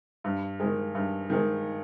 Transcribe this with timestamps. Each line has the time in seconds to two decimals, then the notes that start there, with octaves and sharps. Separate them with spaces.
0.24 G2
0.60 D#3 G#3
0.95 G2
1.30 D#3 G#3